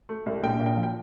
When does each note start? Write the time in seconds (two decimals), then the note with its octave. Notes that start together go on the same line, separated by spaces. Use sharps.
0.09 A3
0.26 C2
0.43 A#1 G5
0.59 A#2
0.66 G5
0.77 F3
0.83 G5